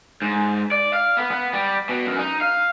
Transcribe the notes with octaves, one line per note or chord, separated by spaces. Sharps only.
G#2
D5
F5
B3
B3
G3
B2
F#2
D#4
F5